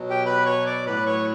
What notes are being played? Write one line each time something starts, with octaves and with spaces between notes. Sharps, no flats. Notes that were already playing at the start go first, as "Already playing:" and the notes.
Already playing: B2 F#3
G4 G5
B4 B5
C#5 C#6
D5 D6
A2 F#3 B4 B5
C#5 C#6